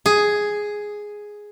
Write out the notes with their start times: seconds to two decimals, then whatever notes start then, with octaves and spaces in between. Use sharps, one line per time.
0.06 G#4